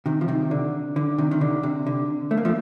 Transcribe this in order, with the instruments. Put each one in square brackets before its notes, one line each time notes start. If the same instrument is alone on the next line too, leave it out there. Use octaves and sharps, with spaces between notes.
[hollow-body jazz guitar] C3 D#3
F3
C3 D#3
D3
D3
C3 D#3
D#3
D3
C3
D3
A3
A#3
F3 A3